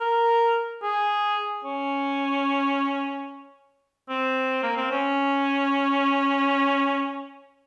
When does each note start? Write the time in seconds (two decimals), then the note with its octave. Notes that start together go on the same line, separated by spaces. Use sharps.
0.01 A#4
0.83 G#4
1.65 C#4
4.09 C4
4.63 A#3
4.77 C4
4.91 C#4